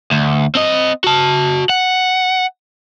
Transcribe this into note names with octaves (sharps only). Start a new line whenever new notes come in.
D2
C4 D#5
F#4 A5
F#5